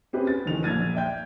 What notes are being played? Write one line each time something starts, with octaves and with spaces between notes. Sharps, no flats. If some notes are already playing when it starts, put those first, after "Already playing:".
C4 C#4 G4 G#4 B4
A6
A1 D2 D#3 F7
A#1 G#6 A6 D#7
D5 E5 G5 G6